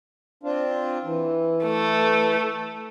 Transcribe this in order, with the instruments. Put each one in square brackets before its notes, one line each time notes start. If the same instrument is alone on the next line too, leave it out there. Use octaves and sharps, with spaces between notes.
[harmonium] C4 D4 F4
E3
[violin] A3